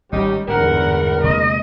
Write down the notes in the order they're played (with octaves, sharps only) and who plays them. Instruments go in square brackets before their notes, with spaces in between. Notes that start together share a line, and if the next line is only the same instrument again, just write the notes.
[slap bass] G#1 [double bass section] G3 [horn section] C#4 D#4 G4
[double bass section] G1 E2 [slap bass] G#2 [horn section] A#4 [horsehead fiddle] F#5
[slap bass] C3 G#3 A#3 [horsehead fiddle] D#5